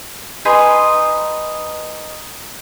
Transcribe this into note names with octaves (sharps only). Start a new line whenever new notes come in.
D#4 B4 G#5 C6